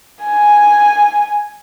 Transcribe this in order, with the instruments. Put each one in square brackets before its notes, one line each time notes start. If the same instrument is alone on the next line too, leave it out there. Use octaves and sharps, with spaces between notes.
[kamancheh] G#5